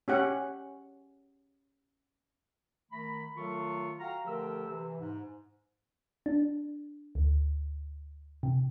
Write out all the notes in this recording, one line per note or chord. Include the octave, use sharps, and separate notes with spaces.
C#4 G4 F#5
D#3 A3 A#5 B5
D#3 F#3 A3 F4 A4 C#6
F#4 F5 G5 A#5
D3 F3 A3 G4 A#4 E6
C3 E3
G#2
D4
D2
C3